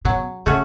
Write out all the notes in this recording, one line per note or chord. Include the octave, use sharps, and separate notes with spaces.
B2 F#3
C#3 A3 C#4 F#4